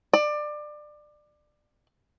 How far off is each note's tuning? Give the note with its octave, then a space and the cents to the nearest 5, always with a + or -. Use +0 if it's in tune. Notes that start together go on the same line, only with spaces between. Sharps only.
D5 +25